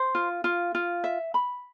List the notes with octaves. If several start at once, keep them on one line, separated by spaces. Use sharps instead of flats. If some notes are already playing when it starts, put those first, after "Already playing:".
Already playing: C5
F4
F4
F4
E5
B5